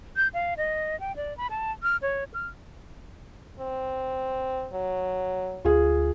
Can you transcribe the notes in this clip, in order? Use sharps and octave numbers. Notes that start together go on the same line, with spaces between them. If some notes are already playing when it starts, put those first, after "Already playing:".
G6
F5
D#5
G5
D5
B5
A5
F6
C#5
F6
C4
F#3
D2 F4 G#4